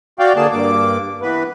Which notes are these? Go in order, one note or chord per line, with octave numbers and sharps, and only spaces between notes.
F#4 D5 F5 G5
D3 A#3 G#4 D5 A5
G2 A#3 D6
E3 B3 B4